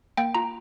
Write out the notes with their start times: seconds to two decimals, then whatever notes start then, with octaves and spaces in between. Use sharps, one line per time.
0.17 A#3 G5
0.35 F4 A#5